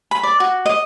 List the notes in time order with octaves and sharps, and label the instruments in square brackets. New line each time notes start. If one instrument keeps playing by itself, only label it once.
[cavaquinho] B5
D5
F#4
D#5